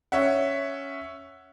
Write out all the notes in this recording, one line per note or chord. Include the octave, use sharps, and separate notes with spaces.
C#4 E5 F#5